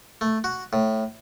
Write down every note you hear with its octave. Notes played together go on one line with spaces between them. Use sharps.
A3
F#4
A2